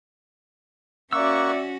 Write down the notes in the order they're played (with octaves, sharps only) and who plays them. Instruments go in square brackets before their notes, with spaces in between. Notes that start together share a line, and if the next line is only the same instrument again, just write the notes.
[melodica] A#3 F#5 C#6 [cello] C#4 F#4 [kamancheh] D5 E5 [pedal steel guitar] E6